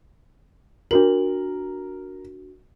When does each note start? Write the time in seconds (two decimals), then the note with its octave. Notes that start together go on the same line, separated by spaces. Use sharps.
0.91 D4 F#4 A#4 F#7